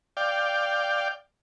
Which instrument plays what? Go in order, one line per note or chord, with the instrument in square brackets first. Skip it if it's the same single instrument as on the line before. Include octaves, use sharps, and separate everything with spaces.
[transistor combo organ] D5 F5 G5